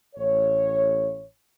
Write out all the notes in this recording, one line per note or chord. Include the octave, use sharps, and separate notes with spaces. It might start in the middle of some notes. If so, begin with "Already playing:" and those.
A1 C#5